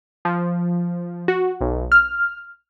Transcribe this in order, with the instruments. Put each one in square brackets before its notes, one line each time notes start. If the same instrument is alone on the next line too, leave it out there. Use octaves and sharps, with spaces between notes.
[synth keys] F3
F#4
B1
F6